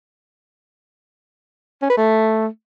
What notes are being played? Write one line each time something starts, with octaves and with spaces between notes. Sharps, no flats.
C#4
B4
A3